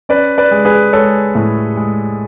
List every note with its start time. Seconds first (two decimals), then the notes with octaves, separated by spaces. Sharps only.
0.09 C#4 B4 D5
0.38 B4 D5
0.51 G#3
0.65 G#4 B4
0.93 G#3 A4 C#5
1.35 A2
1.77 G#3